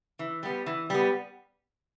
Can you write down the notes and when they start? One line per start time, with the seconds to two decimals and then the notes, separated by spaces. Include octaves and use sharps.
0.19 E3
0.43 G3 B3
0.66 E3
0.90 G3 B3